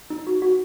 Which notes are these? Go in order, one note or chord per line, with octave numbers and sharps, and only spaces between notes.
D#4
F#4
F#4